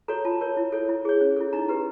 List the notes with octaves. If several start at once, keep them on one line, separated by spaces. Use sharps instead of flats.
F#4 A4 C#5 A#5
F4 A5
A#4 C#5
E4
A4 C#5
E4
G#4 C#5
C#4
E4 A4
D#4 A#5
G4 B4 A#5